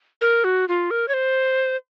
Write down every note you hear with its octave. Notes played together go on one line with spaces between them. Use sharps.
A#4
F#4
F4
A#4
C#5
C5